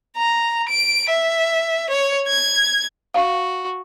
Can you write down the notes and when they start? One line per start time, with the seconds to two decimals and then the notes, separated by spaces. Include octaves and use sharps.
0.17 A#5
0.69 D7
1.10 E5
1.90 C#5
2.28 G#6
3.14 F#4 F5